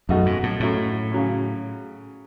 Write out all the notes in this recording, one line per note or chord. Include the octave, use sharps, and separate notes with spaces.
F#2 B2 A3 D#4 F#4
G#2
A2
A2 F#3 A3 C#4
C#3 F#3 C#4